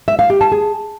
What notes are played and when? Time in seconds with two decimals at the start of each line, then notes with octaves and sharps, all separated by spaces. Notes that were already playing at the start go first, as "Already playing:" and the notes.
0.08 E5
0.19 F5
0.30 G4
0.41 A5
0.52 G#4